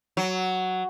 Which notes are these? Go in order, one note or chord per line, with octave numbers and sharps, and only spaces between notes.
F#3